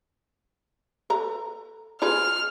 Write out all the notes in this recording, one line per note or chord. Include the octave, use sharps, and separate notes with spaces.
A4 B4 A#5
F4 G#4 B4 F6